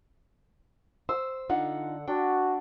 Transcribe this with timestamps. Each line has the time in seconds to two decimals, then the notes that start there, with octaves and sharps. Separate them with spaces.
1.09 C5 E6
1.49 D3 D4 D#4 F4 F#5
2.08 D4 F#4 G5